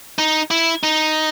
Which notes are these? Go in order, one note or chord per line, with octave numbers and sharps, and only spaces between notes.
D#4
E4
D#4